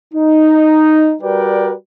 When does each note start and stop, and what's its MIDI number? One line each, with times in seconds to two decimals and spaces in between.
0.14 1.14 63
1.22 1.73 55
1.22 1.73 66
1.22 1.73 70
1.22 1.73 71
1.22 1.73 74
1.22 1.73 79